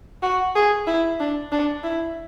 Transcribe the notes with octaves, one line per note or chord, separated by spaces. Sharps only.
F#4
G#4
E4
D4
D4
E4